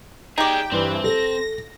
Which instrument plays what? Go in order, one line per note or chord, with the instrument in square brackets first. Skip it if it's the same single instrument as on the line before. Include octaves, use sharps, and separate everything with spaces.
[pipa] D#4 G4 [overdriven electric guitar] G#4 D5 [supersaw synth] G5
[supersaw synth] G2 E3 [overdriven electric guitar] C4
[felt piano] A4 [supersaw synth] A#6